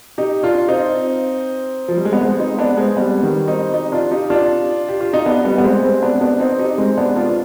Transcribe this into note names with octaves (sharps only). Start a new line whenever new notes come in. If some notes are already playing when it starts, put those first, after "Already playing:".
D#4 G4
D4 F4
C4 D#4
F3
G3
G#3
B3
G#3 C4
C4 D#4
B3 D4
G#3 C4
G3 B3
D#3 G3
C4 D#4
D#4 G4
D4 F4
D#4 G4
D4 F4
G4
F4
D#4
B3 D4
G3 B3
B3
G#3 C4
G#3 C4
B3 D4
B3 D4
C4 D#4
D#4 G4
G#3 C4
B3 D4
D4 F4
F4